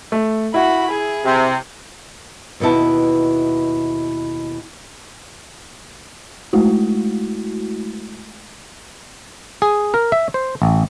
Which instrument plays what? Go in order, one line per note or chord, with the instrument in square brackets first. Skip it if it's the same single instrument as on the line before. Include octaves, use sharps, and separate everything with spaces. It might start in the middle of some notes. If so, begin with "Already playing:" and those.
[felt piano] A3
[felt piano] E4 [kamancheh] F#4 B5
[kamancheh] G#4
[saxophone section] C3
[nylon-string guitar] D#2 B2 B3 E4 A5
[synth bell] G#3 A3 E4 F#4
[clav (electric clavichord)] G#4
A#4
E5
C5
A1